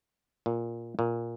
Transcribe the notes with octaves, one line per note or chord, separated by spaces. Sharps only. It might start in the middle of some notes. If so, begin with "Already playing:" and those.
A#2
A#2